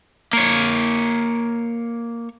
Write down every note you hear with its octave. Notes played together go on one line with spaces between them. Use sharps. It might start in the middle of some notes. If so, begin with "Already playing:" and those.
A#3 C#5